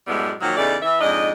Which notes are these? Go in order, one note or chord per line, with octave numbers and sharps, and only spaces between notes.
F#2 A2 G3 G#3 B3 E4
A#2 D#3 F3 F#3
E2 C#3 A3 D#4 D5
E3 E5
F2 G#2 D4 D#5